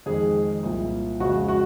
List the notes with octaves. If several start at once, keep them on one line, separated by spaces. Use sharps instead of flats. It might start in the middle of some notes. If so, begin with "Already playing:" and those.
F2 D#3 G#3 G#4
C2 A#2 F3
F2 C#3 G#3 F#4
F#4